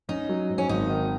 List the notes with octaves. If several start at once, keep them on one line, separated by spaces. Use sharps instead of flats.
C#4 D#4
F#3
G#2
C#4
G#1 D#4
D#3